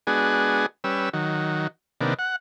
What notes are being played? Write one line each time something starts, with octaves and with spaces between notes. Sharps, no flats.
G#3 B3 D4 F#4 G#4
G3 C#4 B4 E6
D#3 F#3
C3 D#3 A#3 B3 D4
F#5